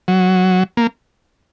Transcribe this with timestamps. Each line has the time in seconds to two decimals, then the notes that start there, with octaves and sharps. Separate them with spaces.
0.08 F#3
0.77 A#3